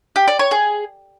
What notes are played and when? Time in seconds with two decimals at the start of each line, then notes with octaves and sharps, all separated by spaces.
0.16 G4
0.28 D5
0.39 C#5
0.51 G#4